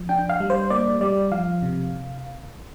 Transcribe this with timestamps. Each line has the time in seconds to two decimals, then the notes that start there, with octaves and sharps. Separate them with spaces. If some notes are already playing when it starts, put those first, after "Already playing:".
Already playing: F3
0.09 D4 G5
0.29 F5
0.40 G3
0.50 C5
0.70 A#3 D5
1.01 G3 D5
1.32 F3 F5
1.62 C3